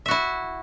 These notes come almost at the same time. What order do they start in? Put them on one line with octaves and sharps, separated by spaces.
E5 F#4 E4